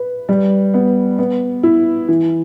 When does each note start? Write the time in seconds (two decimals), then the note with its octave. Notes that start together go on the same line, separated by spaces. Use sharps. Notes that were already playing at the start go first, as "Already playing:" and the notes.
Already playing: B4
0.29 G3
0.74 B3
1.19 B3
1.63 E4
2.08 E3